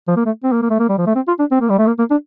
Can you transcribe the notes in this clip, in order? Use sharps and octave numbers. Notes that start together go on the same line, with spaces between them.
F3
A#3
A3
C4
A#3
A#3
A3
A#3
G3
F3
A3
C4
F4
D4
C4
A#3
G3
A3
A#3
A#3
D4